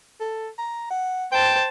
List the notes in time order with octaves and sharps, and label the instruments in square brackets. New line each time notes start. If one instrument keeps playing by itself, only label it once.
[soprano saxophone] A4
A#5
F#5
[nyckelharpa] C5 A5 [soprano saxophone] G5